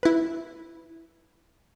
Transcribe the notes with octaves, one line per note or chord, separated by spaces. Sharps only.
E4 B4